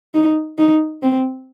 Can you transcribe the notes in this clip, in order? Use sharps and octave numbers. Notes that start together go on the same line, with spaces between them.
D#4
D#4
C4